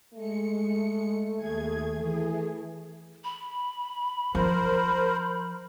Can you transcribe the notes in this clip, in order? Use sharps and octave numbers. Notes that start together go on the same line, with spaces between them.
G#3 A3 C#7
D#2 G#4 G#6
E3 G#4
B5
F3 A#4 C5